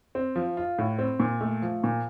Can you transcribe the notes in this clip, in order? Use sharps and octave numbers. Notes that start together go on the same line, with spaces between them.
C4
F3
F4
A2
C4
A#2
A3
F3
A#2